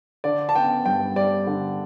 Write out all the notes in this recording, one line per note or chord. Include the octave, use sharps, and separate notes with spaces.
D3 D5
A5
B3 G5
G2 G5
G3 D5
D3